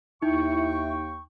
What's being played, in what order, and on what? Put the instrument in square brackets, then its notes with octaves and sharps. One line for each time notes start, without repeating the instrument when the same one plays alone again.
[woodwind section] D#2 G5 C#6 [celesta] D#4 [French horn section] E4